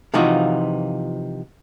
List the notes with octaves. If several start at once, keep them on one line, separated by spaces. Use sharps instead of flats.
C3 E3 F3 D#4 F4 F#4